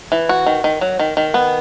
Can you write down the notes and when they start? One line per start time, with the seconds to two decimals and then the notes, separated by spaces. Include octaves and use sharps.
0.12 E3
0.29 F#4
0.46 D#3
0.64 D#3
0.81 F#3
0.99 D#3
1.17 D#3
1.34 B3